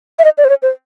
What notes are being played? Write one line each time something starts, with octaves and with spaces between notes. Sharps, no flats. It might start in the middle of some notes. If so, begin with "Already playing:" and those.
E5
D#5
D5
C5
C#5
C5